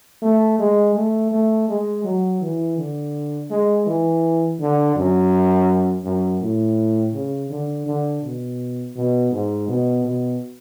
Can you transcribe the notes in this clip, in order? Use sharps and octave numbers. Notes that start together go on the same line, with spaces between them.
A3
G#3
A3
A3
G#3
F#3
E3
D3
G#3
E3
D3
F#2
F#2
A2
C#3
D3
D3
B2
B2
G#2
B2
B2